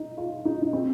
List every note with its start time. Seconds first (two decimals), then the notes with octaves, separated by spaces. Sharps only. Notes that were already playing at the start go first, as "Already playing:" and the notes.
Already playing: D#4
0.17 F4
0.45 D#4
0.62 D#4
0.73 C4